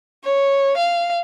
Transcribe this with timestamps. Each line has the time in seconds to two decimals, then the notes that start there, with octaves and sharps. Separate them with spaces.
0.24 C#5
0.77 F5